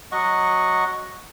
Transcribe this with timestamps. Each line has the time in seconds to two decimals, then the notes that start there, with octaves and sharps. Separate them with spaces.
0.12 F#3 D#5 F#5 C#6